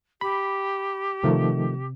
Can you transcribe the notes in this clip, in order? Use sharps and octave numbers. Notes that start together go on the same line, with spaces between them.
G4 B5
C3 D#3 F3 A3